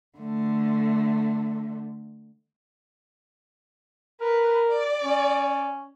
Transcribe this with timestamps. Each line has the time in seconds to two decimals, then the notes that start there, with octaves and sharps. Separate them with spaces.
0.18 D3 A3
4.21 A#4 B4
4.69 D5
5.04 C#4